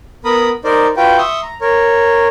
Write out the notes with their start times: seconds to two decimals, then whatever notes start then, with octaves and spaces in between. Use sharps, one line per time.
0.25 B3 A#4 B5 D#6
0.64 D#4 A#4 C5 D5
0.97 F4 F#4 B4 G5
1.18 E5 C6 C#6 D#6
1.43 A#5
1.61 A#4 C#5